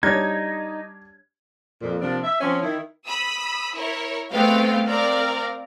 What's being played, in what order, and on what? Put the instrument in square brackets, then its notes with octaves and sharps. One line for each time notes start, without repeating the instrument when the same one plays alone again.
[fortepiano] G3 D4 C#5 [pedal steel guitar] D#4 [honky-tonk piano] G#6
[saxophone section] F2 A#2
C3 F3 A#3 D4
E5
F3 C4 C#4
D#3 E4
[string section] B5 D#6 E6
E4 A#4 C#5
G#3 A3 B3 C4 F5 G5
C4 A#4 D5 F5 A#5